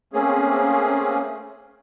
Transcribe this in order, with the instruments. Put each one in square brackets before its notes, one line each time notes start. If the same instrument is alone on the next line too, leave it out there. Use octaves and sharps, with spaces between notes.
[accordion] A3 A#3 C4 C#4 G#4